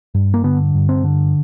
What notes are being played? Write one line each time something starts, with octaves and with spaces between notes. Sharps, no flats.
G2
A#3
D3 B3
G2
C4
D3